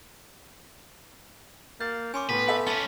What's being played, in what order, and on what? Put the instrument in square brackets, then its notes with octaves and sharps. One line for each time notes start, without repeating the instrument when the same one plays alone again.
[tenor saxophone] A#3 [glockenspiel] G6 [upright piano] A6
[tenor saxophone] C#4 [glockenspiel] G#5 C6 D6
[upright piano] A2 [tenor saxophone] B3 [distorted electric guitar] B4
[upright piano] A4 E5
[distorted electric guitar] C#4 B4 [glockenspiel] A5 A6